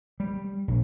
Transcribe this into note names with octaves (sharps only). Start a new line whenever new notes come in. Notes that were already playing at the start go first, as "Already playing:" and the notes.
G3
A#1